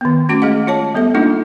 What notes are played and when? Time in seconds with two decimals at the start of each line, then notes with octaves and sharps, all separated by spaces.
0.01 D#3 B3
0.29 A3 C#4 F#4 D6
0.42 G#3 G#4 D#5 F#5
0.67 F4 C#5 A5
0.95 G3 B3 A4 E5
1.14 G#3 A#3 D4 D#4 F4